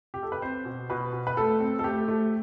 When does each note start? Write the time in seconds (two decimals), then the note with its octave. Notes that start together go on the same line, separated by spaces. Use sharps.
0.14 G4
0.23 A4
0.32 B4
0.42 C4 C5
0.65 B2
0.90 B2 B4
1.13 B2
1.27 B4
1.37 A3 A4
1.60 C4
1.79 A4
1.84 A3 G4
2.08 A3